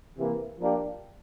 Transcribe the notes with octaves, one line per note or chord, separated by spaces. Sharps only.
C3 E3 A#3
F3 A#3 D4 G4